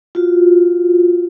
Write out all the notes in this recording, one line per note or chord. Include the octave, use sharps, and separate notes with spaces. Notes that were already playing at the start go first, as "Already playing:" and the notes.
F4 F#4